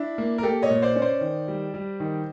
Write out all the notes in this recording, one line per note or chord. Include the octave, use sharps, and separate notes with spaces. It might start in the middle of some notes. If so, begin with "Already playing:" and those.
Already playing: D4 E4
A#3
A#4
A#3 G4 A4
C#5 D#5
A#2
C5 D5
C#4
C5 D5
D#3
G3
G3
D#3